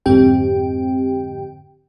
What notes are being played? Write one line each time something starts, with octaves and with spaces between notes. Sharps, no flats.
F2 G#2 D3 C4 G4 G5